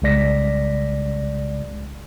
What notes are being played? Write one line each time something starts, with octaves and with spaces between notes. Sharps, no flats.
C2 C#3 G#3 D5 A#6 B6